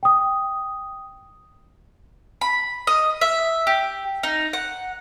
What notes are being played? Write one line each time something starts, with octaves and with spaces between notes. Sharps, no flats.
G5 D#6
B5
D#5
E5
G4
D#4
F#5